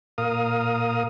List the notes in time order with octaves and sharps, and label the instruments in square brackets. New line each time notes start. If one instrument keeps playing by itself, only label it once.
[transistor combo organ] A#2 A#4 F5 D#6